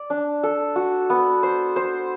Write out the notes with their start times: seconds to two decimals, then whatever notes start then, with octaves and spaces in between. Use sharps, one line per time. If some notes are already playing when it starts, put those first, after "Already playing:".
Already playing: D5
0.10 D4
0.43 A4
0.76 F#4
1.10 B3
1.43 C5
1.76 C5